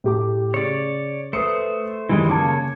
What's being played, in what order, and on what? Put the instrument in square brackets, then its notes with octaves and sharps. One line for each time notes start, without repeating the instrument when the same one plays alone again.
[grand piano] A2 G4 D6
[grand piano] C#3 [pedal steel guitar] C#5 D5
[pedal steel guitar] A3 C5 [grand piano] B4 D#6 C#7
[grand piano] F#2 D#3 [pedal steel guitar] E3 G3 G#3
[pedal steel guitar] C#3 A#3 C#5 [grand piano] A5 D6